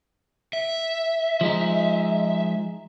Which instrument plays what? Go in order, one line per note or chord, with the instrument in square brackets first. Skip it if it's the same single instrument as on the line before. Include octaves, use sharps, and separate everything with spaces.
[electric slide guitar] E5
[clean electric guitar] F3 G#3 D#4